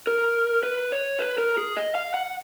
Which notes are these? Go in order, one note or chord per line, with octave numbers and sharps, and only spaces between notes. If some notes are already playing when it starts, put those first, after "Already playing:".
A#4
B4
C#5
B4
A#4
G#4
D#5
F5
F#5